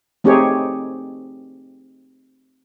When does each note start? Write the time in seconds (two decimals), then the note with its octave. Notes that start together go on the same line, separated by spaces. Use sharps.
0.24 A3 C4 D#4 G4 G#4 C#5